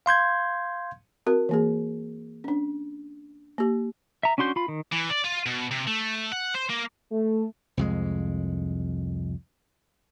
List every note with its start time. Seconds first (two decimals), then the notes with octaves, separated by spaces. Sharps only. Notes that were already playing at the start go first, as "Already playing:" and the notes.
0.06 F5 C6 G6 G#6
1.26 C4 F#4 A#4
1.49 E3 A#3 G#4
2.44 C#4 D4
3.58 A#3 G4
4.23 E5 A#5
4.38 C#4 D4 F#4 C6 G6
4.56 F4 B5
4.68 D#3
4.92 E3
5.10 D5
5.24 F4
5.46 B2
5.71 C3
5.87 A3
6.32 F#5
6.54 C5
6.69 A#3
7.11 A3
7.77 C2 F2 G#3